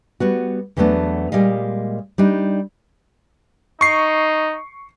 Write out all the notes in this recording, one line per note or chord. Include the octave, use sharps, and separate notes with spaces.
G3 B3 F#4
E2 F#3 G3 A3 B3 D4
A#2 G3 G#3 D#5 F5
G3 D4 D#4
D#4 C#6 C7